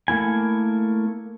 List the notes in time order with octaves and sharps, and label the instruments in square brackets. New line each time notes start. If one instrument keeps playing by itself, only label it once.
[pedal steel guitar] A3 A#3 E4 G#5